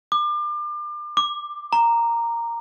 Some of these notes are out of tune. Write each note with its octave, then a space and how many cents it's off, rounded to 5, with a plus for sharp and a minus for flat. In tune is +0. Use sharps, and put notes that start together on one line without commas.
D6 +35
D6 +10
A#5 -5